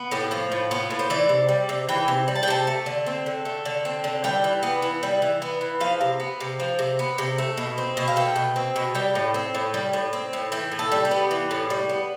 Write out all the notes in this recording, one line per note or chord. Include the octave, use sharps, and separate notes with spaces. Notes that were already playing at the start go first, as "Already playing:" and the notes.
Already playing: B3
A2 G4
F3 F4
A2
B3 F4
A2
C5
E3 D5
C3
G3
C3
E3 G5
C3
G3
A5
G5
C3 A5
A3
D3
C4
D3
A3
D3
C4
D3
G3 G5
E3
B3
E3
G3
E3
B3
E3
F3 F5
C3
B3
C3
F3
C3
B3
C3
A3
B2
C4
B2
F5
A3 G5
B2
C4
B2
G3 G5
A2
C4
A2
G3
A2
C4
A2
E3 G5
A2
A4
G3
G4
B3
E3
A2
G3
B3